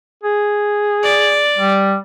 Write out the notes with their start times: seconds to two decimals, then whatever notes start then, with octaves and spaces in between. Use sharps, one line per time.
0.24 G#4
1.03 D5
1.58 G3